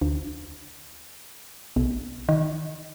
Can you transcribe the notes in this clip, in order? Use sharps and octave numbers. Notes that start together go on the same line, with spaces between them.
D2
B1
D#3